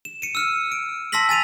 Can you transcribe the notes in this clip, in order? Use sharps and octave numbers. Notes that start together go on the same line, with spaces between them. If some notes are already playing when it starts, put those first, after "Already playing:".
E7
C#7 D#7
E6 F6 C#7
D7
A5 C6 E6 A#6 B6 F#7
G#5 A6 D#7 F7